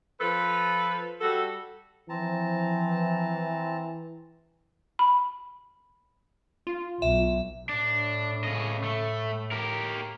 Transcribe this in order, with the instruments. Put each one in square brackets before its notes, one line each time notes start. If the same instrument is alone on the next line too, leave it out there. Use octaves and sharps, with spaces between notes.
[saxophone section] F3 A4 B4
G3 F#4 A4
[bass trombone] E3 [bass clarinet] F3 [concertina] C4 A5 A#5
[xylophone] B5
[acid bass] F4
[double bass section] B1 [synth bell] E5
[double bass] A2 [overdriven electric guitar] D4
[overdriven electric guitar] C#3 D#5
A3
G4 A#4